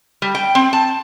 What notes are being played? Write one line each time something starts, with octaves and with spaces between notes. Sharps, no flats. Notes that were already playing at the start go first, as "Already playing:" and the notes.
G3
G5
C4
A5